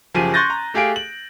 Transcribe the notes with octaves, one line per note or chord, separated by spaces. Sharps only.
F#1 F3 G4 G#4 D#7
C6 C#6 F#6 G6 A6 A#6
A#5
A3 G4 G#4 F5 D7
F#7